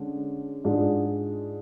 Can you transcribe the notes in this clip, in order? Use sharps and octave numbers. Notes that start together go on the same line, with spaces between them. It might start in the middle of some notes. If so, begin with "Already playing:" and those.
Already playing: D3 G#3 C#4
G#2 G#3 D4 F4 G#4